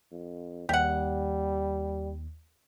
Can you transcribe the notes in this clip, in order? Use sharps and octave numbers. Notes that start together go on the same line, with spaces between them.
F2
D#2 G3 G4 F#5